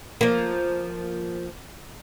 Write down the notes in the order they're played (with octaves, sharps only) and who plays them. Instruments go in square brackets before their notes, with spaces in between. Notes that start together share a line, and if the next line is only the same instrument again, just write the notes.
[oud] F3 A#3